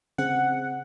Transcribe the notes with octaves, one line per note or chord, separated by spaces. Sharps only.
C#3 C4 G#4 F#5